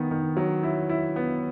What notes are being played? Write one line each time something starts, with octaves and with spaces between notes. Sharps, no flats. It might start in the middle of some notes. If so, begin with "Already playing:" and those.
Already playing: D#3 B3
D#3
F#3
E4
E4
B3